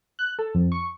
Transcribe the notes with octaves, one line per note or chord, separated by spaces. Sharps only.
F#6
A4
F2
C#6